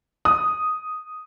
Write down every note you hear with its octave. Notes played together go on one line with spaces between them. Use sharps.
D#6